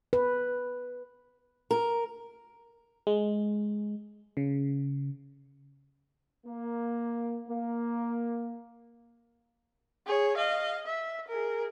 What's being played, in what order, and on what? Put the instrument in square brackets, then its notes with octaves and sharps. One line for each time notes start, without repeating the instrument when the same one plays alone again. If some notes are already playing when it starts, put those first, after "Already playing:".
[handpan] B4
[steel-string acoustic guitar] A#4
[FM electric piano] G#3
C#3
[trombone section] A#3
A#3
[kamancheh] G#4 C#5
D#5 F5
E5
G#4 A#4